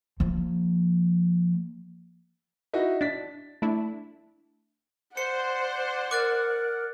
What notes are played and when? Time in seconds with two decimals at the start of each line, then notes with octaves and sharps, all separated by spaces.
0.20 F3 A#3
2.73 D#4 E4 F#4
3.01 D4 A6 B6
3.62 A3 D4 E4
5.17 C5 D5 F#5 C#7
6.11 A#4 D6 F#6 A6